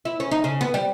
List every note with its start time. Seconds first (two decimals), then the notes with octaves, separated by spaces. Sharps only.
0.05 E4
0.20 C#4
0.31 D#4
0.44 C#3
0.61 B3
0.74 G3